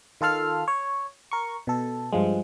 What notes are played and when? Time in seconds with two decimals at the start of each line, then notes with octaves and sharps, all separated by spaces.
0.21 D#3 F4 A4 F5 F6
0.68 C#5
1.31 A#4 C#6
1.67 B2 A4
2.12 G2 F3 G#3